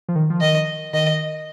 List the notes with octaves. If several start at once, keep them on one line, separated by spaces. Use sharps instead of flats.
F3
D#3
F3
D#3 D#5
D#3 D#5